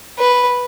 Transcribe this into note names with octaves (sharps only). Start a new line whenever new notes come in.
B4